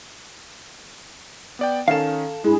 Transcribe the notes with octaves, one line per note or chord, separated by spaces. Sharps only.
B3 D5 G5
D#3 C#4 A4 F5 E7
G2 G#3 E4 G#4